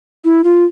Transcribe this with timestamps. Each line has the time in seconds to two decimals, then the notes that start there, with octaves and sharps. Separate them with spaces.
0.25 E4
0.44 F4